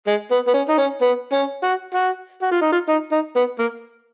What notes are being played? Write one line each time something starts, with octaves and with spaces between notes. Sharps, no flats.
G#3
B3
B3
C#4
D#4
C#4
B3
C#4
F#4
F#4
F#4
F4
D#4
F4
D#4
D#4
B3
A#3